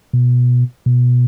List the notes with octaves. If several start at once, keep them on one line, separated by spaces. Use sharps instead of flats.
B2
B2